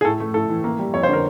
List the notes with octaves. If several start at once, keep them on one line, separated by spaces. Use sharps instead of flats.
G#4
A2 A4
A3
A2 A4
E3
A#3
G3
F2 C#5
C5
D3 A#4